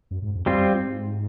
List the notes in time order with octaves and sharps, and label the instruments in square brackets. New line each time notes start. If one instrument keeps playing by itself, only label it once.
[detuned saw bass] F#2
G#2
F2
[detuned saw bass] F2 [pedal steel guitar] G3 C4 F4
[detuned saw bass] F#2
G#2
G#2